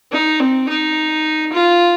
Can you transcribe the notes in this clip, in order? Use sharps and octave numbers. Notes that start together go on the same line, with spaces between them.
D#4
C4
D#4
F4